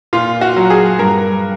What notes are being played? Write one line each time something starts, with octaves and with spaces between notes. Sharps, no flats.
A#2 F4
F#4
F#3
G#4
G2 A#4